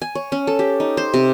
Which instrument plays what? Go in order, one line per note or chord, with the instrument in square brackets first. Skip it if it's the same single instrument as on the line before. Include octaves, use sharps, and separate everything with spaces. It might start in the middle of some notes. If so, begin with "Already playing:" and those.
[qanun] G#5
C#5
C#4
A4
G4
D#4
C5
C3